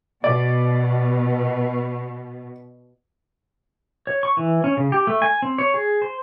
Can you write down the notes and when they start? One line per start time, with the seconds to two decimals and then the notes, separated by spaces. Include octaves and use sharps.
0.24 B2 D5
4.07 C#5
4.23 C#6
4.37 E3
4.64 C#4
4.77 C#3
4.92 G4
5.07 A3
5.22 G#5
5.42 C4
5.58 C#5
5.74 G#4
6.02 C5